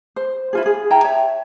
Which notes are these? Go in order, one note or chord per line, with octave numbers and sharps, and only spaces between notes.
C5
E4 F4 G#4
G#4
E4 G5 A5 A#5
C#5 E5